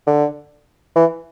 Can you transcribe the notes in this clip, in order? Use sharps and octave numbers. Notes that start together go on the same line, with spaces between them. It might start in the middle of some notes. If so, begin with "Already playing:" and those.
D3
E3